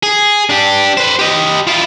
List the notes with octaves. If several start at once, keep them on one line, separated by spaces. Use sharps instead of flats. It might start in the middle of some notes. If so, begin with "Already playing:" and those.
G#4
D4 G4
B4 C5
G4 D#5
E4 F4